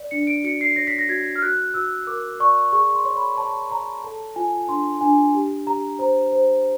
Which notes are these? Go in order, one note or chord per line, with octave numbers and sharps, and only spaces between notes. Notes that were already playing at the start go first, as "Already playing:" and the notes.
Already playing: D5
D4 C#7
D7
F#4 C#7
C7
C#5 A#6
B6
A#6
F#4 G#6
F6
F#4 F#6
F#4 E6
A#4 D6
D5 C#6
G#4 C#6
C6
C#5
B5
C#5 A5
C#5 A#5
A4 A5
F4 G#5
D4 C6
D4 G#5
G4
G4 A#5
C5 A#5
C5